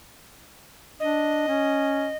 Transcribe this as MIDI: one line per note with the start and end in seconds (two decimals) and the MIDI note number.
1.00 1.44 62
1.00 2.17 75
1.48 2.11 61